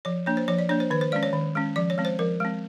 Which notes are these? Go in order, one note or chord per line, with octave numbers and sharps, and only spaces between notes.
F3 C#5
A#3 D4 C#5
C5
F3 C#5
D5
A#3 D4 C#5
C5
D#3 B4
C5
G#3 C#4 D5
C#5
D#3
G#3 C#4
F3 D5
C#5
G#3 C4
C5
F3 A#4
G#3 C4